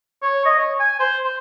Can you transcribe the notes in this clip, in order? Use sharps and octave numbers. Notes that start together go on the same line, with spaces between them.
C#5
D#5
C#5
G#5
C5
C5